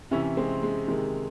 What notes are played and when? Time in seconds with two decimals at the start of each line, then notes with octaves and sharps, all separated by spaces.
0.11 C3 E3 C#4 E4
0.37 G#3 C4
0.63 G#3
0.88 C3 D#3 G#3